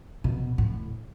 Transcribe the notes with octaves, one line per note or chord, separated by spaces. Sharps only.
B2
A2